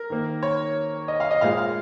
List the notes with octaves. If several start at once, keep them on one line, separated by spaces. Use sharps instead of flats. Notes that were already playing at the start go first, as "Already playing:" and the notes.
Already playing: A#4
D#3 A#3
C#5
D#5
F5
D#5
A#2 G#3 F5
F5